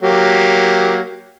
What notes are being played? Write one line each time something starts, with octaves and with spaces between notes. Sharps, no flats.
F#3 A#3 G4